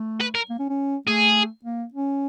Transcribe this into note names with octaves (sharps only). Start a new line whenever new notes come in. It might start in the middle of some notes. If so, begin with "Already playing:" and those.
Already playing: A3
B4
A#4
A#3
C#4
C#4
A3 G#4
A#3
C#4